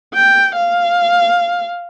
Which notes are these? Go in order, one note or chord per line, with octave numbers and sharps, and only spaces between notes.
G5
F5